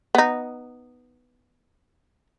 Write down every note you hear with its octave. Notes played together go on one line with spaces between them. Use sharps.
B3 D#4